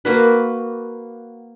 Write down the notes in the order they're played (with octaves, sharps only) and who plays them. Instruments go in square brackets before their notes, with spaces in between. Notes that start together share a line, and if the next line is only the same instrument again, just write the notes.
[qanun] A#3 F#4 B4